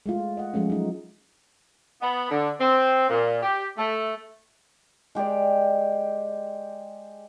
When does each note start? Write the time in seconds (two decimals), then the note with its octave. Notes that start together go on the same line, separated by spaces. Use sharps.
0.06 G#3 A3 F4
0.37 D#5 F#5
0.54 F3 G#3 A3 C#4
0.70 F#3 D#4
2.01 B3
2.30 D3
2.59 C4
3.09 A#2
3.42 G4
3.78 A3
5.15 G#3 G4 G#4 D5